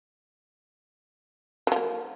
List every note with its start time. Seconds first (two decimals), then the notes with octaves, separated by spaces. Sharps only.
1.67 F#3
1.72 F3
1.76 A#3